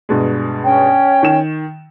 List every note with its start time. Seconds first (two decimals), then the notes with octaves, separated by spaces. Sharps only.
0.09 G2 B2 G#3
0.64 C#4 C#5 G5
1.23 D#3 E7